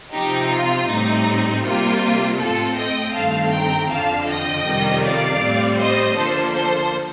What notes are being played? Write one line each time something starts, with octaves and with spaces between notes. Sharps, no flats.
C3 F3 C4 D#4 G4
F4
A2 G3 C4 D#4
C3 G3 A#3 F4
A2 A3 C4 F4 A4
D#5 G5
G2 D#3 A3 C4 F5 A5
G5 A#5
F2 D3 F3 F5 A5
D#5 G5
F2 C3 D#3 G3
D5 F5
A2 G3 C4
C5 D#5
D3 F3 A#3 A4 C5
A4 C5